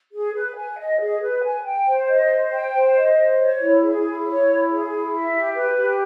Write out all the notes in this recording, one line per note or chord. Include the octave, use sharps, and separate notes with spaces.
G#4
B4
G#5
D#5
G#4
B4
G#5
G5
C5
D#5
C5
G5
C5
D#5
C5
C#5
E4
G#4
E4
C#5
E4
G#4
E4
E5
G4
B4
G4